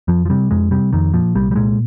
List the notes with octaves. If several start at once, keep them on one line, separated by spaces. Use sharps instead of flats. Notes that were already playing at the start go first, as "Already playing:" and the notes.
F2 F3
F3
C3 G3
F2 G#3
C3 G3
F2 D#3
A#2 F3
C2 G3
G3
A#2 G#3